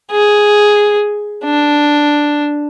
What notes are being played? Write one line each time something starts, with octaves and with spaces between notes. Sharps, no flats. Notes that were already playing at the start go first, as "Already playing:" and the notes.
G#4
D4